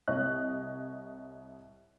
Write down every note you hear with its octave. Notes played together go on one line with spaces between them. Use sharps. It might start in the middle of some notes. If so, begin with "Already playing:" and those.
C2 C#5 D#5 F#6